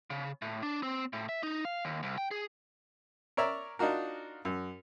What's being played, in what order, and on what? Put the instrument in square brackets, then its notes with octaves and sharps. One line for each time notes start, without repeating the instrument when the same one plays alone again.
[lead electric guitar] C#3
A2
D4
C4
A2
E5
D#4
F5
D#2
C2
G5
G#4
[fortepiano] A#4 C#5 D5 E5 A#5
D4 D#4 F4 F#4 A#4
F#2